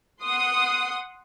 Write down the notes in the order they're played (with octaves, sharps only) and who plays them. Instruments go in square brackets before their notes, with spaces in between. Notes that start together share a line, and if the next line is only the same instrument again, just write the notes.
[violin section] F#5 C6 D#6